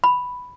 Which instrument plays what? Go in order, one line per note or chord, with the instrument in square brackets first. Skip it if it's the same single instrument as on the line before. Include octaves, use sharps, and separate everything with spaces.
[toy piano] B5